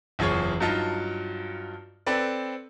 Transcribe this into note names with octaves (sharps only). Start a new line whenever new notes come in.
F#1 E2 F4 G#4 C#5 C#6
G2 F#3 D#4 F4 A5
C4 A4 B4 D5